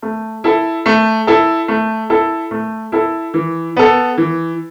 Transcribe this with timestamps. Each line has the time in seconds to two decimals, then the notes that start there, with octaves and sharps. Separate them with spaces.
0.02 A3
0.44 E4 A4
0.86 A3
1.27 E4 A4
1.68 A3
2.10 E4 A4
2.51 A3
2.92 E4 A4
3.34 E3
3.76 B3 A4
4.18 E3